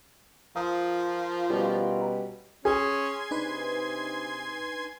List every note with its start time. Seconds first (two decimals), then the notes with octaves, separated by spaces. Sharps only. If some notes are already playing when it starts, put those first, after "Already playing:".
0.56 F3 F4 A#4 D#6
1.50 B2 G3 C#4 G4
2.65 C#4 G#4 G#5 C6 G#6
3.31 C3 D4 D#4 B4